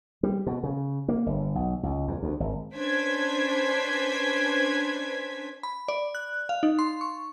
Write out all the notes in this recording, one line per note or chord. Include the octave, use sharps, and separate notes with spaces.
G3
B2
C#3
A#3
G1
B1
C#2
E2
D2
G#1
C#4 D4 B4 C5 G#6 B6
B5
D5
F#6
F5
D#4
C6
C#6